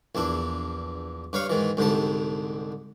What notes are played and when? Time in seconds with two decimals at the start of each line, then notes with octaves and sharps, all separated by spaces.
0.15 A#1 E2 D4 E4
1.33 G2 B4 C#5 F5 C#6
1.50 G#2 D#3 E3
1.77 C2 G#2 D3 G3 A5